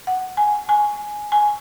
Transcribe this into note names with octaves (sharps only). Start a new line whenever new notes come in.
F#5
G#5
G#5
G#5